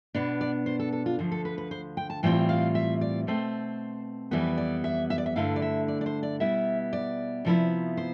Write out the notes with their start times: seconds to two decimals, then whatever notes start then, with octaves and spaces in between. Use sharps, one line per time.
0.14 B2 B3 D4
0.41 D5
0.66 C5
0.79 A4
0.92 A4
1.06 F4
1.19 D2 D3 F3
1.31 A4
1.45 B4
1.58 B4
1.71 C5
1.97 G5
2.10 A5
2.23 A2 E3 G3 C4 F4 G5
2.49 F5
2.75 E5
3.01 D5
3.27 B2 A3 C4 C5
4.31 F2 E3 G3 B3 B4
4.57 D5
4.84 E5
5.10 E5
5.18 D5
5.26 E5
5.36 G2 D3 A3 E4 F5
5.56 D5
5.62 E5
5.88 D5
6.01 D5
6.06 C5
6.23 D5
6.40 B2 G3 B3 E4 E5
6.93 D5
7.45 C3 F3 B3 E4
7.97 C5